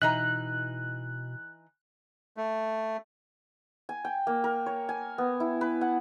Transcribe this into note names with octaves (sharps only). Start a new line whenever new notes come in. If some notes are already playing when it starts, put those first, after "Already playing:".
B2 E3 D#4 A#5 F#6
A3
G#5
G5
A#3
A#4
C#5
G#5
B3
E4
B4
F#5